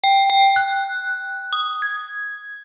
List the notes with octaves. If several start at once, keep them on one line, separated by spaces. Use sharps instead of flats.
G5
G5
F#6
D#6
G#6